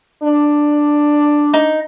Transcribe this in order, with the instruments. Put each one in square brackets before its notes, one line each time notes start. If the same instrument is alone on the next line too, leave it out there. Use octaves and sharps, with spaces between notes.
[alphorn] D4
[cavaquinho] D#4